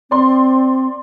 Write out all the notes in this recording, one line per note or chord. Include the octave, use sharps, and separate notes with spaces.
C4 D5 C6